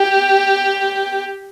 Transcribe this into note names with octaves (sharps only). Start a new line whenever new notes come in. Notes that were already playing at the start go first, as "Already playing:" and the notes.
Already playing: G4